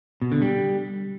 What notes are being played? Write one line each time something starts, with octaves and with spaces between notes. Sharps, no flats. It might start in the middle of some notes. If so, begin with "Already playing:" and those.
B2
D3
G3